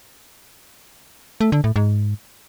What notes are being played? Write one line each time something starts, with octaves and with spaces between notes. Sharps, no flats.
A3
D3
A2
G#2